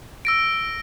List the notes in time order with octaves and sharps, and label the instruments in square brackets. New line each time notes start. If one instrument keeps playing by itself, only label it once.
[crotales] E6 A#6 D7